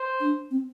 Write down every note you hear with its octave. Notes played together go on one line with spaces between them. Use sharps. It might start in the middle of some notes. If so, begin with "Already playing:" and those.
Already playing: C5
D4
C4